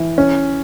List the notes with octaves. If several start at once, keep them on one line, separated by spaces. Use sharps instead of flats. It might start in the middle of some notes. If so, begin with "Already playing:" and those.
Already playing: E3
C#4